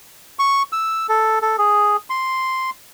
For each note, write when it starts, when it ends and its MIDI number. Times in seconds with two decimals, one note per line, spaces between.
0.39 0.63 85
0.72 1.07 88
1.09 1.39 69
1.42 1.56 69
1.58 1.97 68
2.10 2.70 84